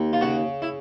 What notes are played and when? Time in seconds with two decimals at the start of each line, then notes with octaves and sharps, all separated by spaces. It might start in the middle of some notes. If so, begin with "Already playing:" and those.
Already playing: D#2
0.13 F4
0.21 C#3 F#4
0.62 E4